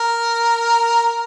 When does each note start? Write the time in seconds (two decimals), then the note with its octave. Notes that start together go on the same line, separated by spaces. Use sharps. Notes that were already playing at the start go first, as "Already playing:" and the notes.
Already playing: A#4